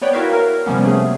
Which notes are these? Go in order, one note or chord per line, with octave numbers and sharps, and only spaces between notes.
B3 B4 C#5 D5 G5
E4 F#4 A#4 E5 F5
A#4
C3 F3 G3 A#3 B3 C#4
C3 F#3 A3 G#4